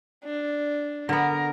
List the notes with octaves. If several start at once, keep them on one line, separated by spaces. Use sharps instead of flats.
D4
D3 B3 A#4